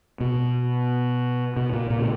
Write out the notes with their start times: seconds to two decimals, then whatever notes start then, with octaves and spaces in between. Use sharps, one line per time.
0.21 B2
1.57 B2
1.73 A#2
1.90 A#2
1.99 C#3